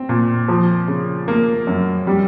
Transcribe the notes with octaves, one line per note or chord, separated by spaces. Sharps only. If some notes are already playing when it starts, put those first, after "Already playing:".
Already playing: C4
A#2
F3
C#3
A#3
F#2
G3